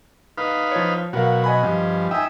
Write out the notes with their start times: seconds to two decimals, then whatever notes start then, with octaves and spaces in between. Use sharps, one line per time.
0.38 D#4 B4 F5
0.72 F3 C#5
1.13 B2 F#3 F#4 A#4 F5
1.44 D#5 G#5 B5
1.63 G2 F3
2.11 D#4 E5 G5 G#5